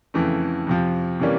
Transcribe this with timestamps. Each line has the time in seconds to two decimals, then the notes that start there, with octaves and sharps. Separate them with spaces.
0.14 F2 C#3 E3 A3
0.67 F2 C3 F3
1.20 C3 E3 G3 A#3 C#4